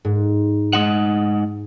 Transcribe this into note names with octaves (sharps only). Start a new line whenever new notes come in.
G#2
G#3 D#4 F#5